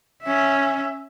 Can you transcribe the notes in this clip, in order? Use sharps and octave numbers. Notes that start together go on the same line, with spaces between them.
C#4 E5